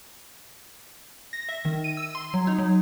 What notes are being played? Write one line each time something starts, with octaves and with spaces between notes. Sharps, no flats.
A#6
E5
D#3
D#7
E6
C6
F#3
D#4
F#3